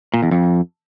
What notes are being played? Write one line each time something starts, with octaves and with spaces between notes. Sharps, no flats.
A#2
E2
F2